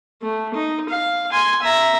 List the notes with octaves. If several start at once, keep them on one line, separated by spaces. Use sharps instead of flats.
A3
D#4
F5
G#5 C6
E5 A#5